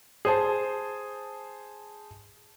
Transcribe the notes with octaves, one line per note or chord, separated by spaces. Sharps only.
G#4 C5 A5